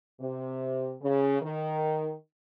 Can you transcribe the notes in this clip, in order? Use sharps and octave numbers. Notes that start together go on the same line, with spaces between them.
C3
C#3
D#3